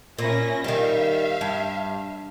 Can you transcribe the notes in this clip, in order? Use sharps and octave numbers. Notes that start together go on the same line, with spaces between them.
A#2 C#4 E4 A#6
D#3 G3 E5 F5
G2